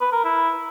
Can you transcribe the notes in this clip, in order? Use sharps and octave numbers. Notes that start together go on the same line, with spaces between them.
B4
A#4
E4